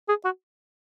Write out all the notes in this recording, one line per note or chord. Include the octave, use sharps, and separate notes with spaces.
G#4
F#4